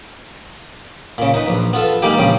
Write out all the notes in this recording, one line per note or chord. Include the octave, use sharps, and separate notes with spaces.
A#2 C#3
D#4 B4
A#1
B3 F4 A4
G3 G#3 A#3 D#4 G4
A#1 C#3 G3 G5 C6